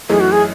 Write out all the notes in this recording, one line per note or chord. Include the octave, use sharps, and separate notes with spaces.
F#2 E3 A3 D#4 G#4
F#4
G#4